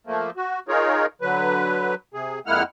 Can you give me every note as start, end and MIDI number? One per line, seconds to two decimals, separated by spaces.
0.07 0.30 53
0.07 0.30 57
0.07 0.30 58
0.37 0.60 66
0.68 1.06 63
0.68 1.06 65
0.68 1.06 68
0.68 1.06 70
0.68 1.06 73
1.21 1.95 50
1.21 1.95 54
1.21 1.95 71
2.14 2.39 48
2.14 2.39 68
2.46 2.63 41
2.46 2.63 56
2.46 2.63 58
2.46 2.63 64
2.46 2.63 78
2.46 2.63 89